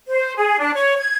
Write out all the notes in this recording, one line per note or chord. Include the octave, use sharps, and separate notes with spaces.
C5
G#4
D4
C#5
G#6